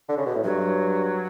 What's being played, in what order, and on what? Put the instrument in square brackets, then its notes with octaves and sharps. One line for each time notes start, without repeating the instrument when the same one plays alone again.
[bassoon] D3
C#3
B2
A2
[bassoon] G2 [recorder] F#3